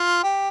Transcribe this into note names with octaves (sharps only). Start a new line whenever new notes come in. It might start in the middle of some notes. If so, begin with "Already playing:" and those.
Already playing: F4
G4